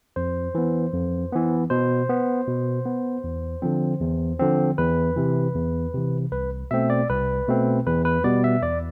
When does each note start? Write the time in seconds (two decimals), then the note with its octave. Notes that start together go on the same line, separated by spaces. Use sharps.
0.16 F2 C5
0.55 E3 B3
0.93 F2
1.32 E3 B3
1.70 B2 C5
2.09 B3
2.47 B2
2.86 B3
3.24 E2
3.62 D3 F3 C4
4.01 E2
4.39 D3 F3 C4
4.78 E2 B4
5.16 C3 E3
5.55 E2
5.94 C3 E3
6.32 C2 B4
6.71 B2 A3 C4 E5
6.90 D5
7.10 C2 B4
7.48 B2 A3 C4
7.87 E2 B4
8.05 B4
8.24 B2 G3 B3 D5
8.44 E5
8.62 E2 D5